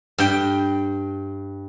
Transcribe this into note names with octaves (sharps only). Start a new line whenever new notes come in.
G2 G5